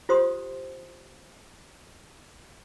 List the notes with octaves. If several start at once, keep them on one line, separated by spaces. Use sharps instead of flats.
F4 G4 C5 C6 D#6